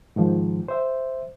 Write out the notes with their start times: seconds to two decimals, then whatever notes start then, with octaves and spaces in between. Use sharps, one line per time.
0.16 G#2 D#3 F3
0.68 C5 E5